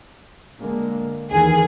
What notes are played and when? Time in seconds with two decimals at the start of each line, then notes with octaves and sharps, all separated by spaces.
0.59 D3 G#3 A#3
1.31 D#2 D#3 E3 G#4